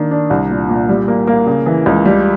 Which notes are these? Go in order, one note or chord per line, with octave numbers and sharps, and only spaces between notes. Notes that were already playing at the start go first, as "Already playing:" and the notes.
Already playing: D#3 A#3 D4
D4
C2
A#2
A#2
G3
A#3
A#3
C#3
E3
C#2
G3